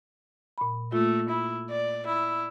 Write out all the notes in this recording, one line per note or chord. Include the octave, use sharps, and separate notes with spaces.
A#2 B5
A3 A#3 F4
E4
D5
E4